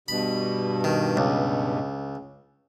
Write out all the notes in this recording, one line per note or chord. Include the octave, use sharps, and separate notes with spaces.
G2 B2 B5
D#3
C#2